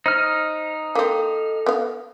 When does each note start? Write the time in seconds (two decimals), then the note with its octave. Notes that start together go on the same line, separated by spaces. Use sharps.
0.06 D#4 C5 F6
0.95 A#3 C4 A4
1.66 B3 F5